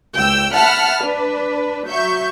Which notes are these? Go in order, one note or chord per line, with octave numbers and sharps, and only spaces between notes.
C#2 G5 E6
E5 F#5 A5 B5 F6
D4 B4
F#3 E5 C#6 G6